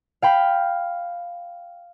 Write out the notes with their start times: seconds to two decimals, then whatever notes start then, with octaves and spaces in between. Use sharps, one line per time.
0.22 F5 G5 B5